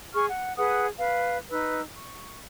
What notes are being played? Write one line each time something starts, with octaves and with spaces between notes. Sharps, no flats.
G#4 C#6 F6
F#5
G#4 B4 F#5 D#6
B4 F5
D#4 B4 E6
C#6